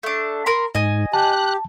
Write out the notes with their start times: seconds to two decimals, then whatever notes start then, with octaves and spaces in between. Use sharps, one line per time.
0.03 A3 D4
0.46 A#4 B5 C6
0.75 G#2 D#5 G#5
1.13 G4 A5 F#6